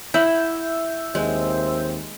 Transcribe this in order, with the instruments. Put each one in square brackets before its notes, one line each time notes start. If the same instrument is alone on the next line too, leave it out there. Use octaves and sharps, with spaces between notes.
[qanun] E4 F#5 [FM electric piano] E5 E6 G6
[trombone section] D#2 C4 C5 [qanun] G#3